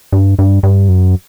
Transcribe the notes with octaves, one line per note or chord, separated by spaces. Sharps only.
G2
G2
G2
F#2